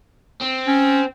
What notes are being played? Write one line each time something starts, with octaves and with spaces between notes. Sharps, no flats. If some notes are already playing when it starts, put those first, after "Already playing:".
C4
C#4